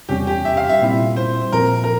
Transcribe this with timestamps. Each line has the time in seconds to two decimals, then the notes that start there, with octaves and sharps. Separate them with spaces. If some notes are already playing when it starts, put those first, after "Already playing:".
0.09 E2 C3 G3 C#4 G4
0.27 G4
0.45 E5
0.57 F5
0.69 E5
0.82 A#2 G3 C4 E4
1.16 C5
1.52 A#2 F3 C4 A#4
1.84 A#4